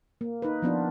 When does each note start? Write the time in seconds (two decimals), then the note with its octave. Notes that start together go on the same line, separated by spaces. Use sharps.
0.21 A#3
0.42 D#4 B4
0.62 F3 B3 D4 F4